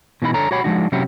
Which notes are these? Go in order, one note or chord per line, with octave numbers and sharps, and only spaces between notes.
B2 E3 G#3 D#4 E5 B5
D3 A4 C#5 A#5
F#4 G4 C#5 F#5 B5
F3 G#3 D4 D#4 F#4
C3 F#3 C#4 E4 F#4 G4